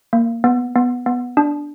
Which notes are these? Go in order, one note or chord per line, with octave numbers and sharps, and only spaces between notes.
A#3
B3
B3
B3
D4